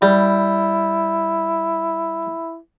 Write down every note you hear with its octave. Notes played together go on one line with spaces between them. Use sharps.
G3 E4